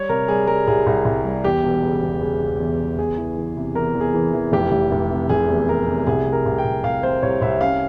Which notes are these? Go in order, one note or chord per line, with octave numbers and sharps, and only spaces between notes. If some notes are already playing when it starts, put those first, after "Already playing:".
Already playing: G3 C#5
C3 A#4
G3 G#4
G3 A#4
C2 G#4
C2
C2
G3
E2 G4
E1
C#3
E1
C#3
C#3
E2
C#3
E2 G#4
E3
E3
C3
E2 A#4
E2
G#4
E3
E3
F1 G4
F1
F1
C3
F1 G#4
E2
E2 A#4
C3
C2 G#4
C3
A#4
C2
G5
C2
C2 F5
C3 C5
C2 C#5
C2 E5
C#4 F5